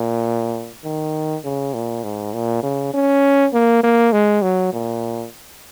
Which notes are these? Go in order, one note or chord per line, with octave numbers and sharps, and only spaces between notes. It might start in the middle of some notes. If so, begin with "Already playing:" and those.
Already playing: A#2
D#3
C#3
A#2
G#2
A#2
C#3
C#4
A#3
A#3
G#3
F#3
A#2